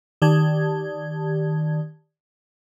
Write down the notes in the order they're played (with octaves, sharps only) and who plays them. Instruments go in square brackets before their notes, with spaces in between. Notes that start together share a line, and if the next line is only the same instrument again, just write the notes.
[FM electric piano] D#3 G4 D5 A5 G#6